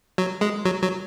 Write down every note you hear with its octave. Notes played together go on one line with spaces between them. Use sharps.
F#3
G#3
F#3
F#3